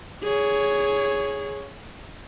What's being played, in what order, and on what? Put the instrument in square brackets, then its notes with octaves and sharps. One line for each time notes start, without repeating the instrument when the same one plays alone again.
[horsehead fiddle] G#4 C#5